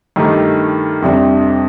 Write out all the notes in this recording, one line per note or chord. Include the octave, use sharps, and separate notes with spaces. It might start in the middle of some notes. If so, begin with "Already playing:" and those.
G2 D#3 A3 D#4 G4
F2 C3 G3 D4